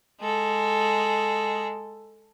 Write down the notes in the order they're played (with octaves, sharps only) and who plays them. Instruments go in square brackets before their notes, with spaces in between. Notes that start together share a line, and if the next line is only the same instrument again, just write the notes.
[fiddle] G#3 A4